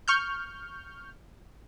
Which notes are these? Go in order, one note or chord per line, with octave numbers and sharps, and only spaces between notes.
C#6 F6 G6